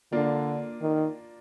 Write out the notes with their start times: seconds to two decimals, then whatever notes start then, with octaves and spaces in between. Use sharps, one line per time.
0.12 D3 A#3 D4 F4
0.82 D#3